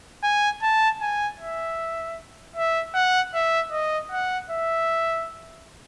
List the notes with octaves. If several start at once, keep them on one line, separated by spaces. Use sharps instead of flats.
G#5
A5
G#5
E5
E5
F#5
E5
D#5
F#5
E5